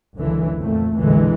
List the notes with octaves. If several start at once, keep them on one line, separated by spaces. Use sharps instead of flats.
F#1 C#2 F#2 D3 E3
F2 A#2 A3
A#1 F2 B2 D3 E3 G#3